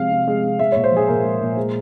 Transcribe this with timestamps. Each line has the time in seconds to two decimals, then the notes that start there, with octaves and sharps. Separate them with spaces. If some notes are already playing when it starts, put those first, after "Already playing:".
Already playing: C3 F3 G#3 F5
0.11 C3
0.28 G#3
0.43 C3
0.59 G#3 E5
0.72 A#2 C#5
0.84 C5
0.92 F3 G#4
1.08 A#2 A#4
1.24 G#3
1.41 A#2
1.56 G#3